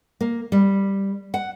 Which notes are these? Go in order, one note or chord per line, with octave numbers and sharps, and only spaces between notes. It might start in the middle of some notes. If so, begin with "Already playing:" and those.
A#3
G3
F#5